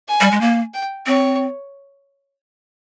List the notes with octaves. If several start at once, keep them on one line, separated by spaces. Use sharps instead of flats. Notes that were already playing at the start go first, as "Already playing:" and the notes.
G#5
G3
G#3
A#3
G5
C4 C#5